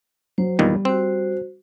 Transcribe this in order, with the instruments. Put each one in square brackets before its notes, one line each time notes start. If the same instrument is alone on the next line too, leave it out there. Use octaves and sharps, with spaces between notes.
[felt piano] F#3 [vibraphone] C5
[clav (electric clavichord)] E2 A#2 D#3 [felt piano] G3 [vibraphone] B3
[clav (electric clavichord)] C4 [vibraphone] F#4 C5